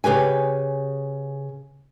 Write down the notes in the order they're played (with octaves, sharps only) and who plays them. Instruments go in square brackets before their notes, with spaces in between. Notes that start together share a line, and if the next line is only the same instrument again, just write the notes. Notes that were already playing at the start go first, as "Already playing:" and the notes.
[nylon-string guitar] C#3 G4 B4 G#5